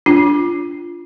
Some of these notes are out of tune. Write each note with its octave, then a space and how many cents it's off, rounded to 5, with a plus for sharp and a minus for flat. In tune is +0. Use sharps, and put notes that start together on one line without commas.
D4 -10 F4 -15